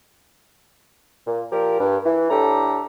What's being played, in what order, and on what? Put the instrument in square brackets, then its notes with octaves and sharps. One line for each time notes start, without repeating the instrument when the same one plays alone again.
[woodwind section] A#2
A#2 F3 G4 A#4
G2
E3
A2 D4 G4 A4 A#5